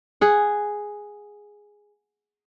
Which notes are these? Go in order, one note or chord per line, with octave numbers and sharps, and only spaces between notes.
G#4 F#5